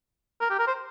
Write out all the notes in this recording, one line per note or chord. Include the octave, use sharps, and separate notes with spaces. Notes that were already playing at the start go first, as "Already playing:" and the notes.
A#4
G4
A#4
C5